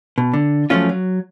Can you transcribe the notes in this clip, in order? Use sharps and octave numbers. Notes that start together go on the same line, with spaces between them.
B2
D3
F#2 F3 F#3 A3 C#4 F4
F#3